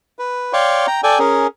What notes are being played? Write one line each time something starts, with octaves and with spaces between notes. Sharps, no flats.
B4
C#5 D5 F5 G5 C6 C#6
G5 A#5
A4 D5 G5 G#5
C#4 G#4 A#4